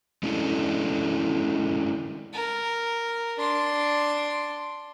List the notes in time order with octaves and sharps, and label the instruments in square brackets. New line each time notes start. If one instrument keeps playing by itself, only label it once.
[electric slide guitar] G#3 C#4 D4 E4 A4
[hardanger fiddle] A#4
D4 C6